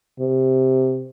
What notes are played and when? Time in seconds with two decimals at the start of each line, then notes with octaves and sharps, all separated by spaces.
0.20 C3